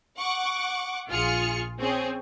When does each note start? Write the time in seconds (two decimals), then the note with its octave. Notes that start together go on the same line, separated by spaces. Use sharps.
0.17 F#5 C#6 D6
1.09 A#1 F4 G#4 F6 C#7
1.79 C4 C#4 G#4